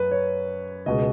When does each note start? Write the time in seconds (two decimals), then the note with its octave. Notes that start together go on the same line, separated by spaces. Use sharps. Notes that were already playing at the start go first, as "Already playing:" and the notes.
Already playing: F#2 B4
0.11 C#5
0.86 C#2 B2 G#3 D#5